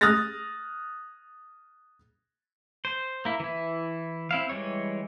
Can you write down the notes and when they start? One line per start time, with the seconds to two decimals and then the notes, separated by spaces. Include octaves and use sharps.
0.01 D#6 F6 F#6 A6 A#6
2.85 C5
3.25 A#3 E4
3.40 E3 E4
4.31 C4 E4 F5
4.49 E3 G3 G#3 C#5